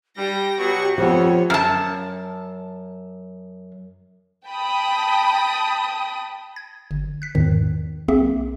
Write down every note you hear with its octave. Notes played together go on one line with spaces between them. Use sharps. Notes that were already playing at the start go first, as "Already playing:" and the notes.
G3 G4 G5 A#6
B2 F#3 F#5 C#6
F2 F3 B3 C#5
F#2 A5
G5 A5 B5 D#6
G#6
G1
F#6 B6
E2 G#2 D#3
B1 A#3 C4 G#4 E5